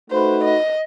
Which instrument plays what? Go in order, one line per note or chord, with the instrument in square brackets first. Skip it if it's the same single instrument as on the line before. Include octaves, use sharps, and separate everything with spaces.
[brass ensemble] A3 D#4 F#4 B4 [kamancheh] C5
[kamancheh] D#5